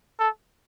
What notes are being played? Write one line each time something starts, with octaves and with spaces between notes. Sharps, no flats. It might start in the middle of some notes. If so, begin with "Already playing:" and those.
A4